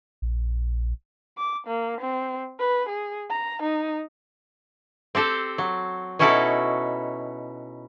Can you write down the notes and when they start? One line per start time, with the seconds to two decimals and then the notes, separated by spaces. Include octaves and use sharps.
0.22 A#1
1.38 D6
1.67 A#3
2.00 C4
2.59 B4
2.89 G#4
3.30 A#5
3.62 D#4
5.15 C4 G4 A4 C5
5.58 F#3
6.19 B2 C#4 D#4 E4 F#4 A4